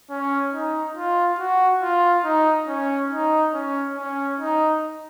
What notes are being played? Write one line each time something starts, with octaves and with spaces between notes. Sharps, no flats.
C#4
D#4
F4
F#4
F4
D#4
C#4
D#4
C#4
C#4
D#4